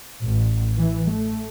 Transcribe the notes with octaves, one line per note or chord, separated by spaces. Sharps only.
A1
E3
A3